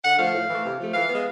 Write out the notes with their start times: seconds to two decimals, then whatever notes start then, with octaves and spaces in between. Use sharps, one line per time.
0.04 D3 F#5
0.19 F3 A3 F5
0.34 A2
0.49 E3 A3
0.64 C3
0.79 F3 A3
0.94 E3 F5
1.09 G#3 B3